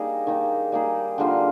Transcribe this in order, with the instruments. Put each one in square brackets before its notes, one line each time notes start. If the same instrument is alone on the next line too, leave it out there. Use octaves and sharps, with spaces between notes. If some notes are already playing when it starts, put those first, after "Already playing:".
Already playing: [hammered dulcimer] G3 A#3 D#4 G#4
D#3 A#3 D#4
G3 A#3 D#4 G#4
D3 G3 A#3 F4